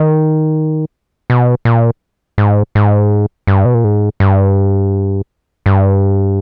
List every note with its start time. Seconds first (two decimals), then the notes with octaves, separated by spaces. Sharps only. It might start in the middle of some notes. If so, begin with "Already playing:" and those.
Already playing: D#3
1.30 B2
1.65 A#2
2.38 G#2
2.75 G#2
3.47 G2
3.65 B2
3.74 A#2
3.84 G#2
4.20 G2
5.66 G2